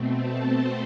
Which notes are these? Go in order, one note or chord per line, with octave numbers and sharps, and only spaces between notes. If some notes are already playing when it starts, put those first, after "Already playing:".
Already playing: B2 A3 C4
A4
C5